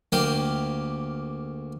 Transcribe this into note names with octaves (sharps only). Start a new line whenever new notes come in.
D2 A#3 G4 F5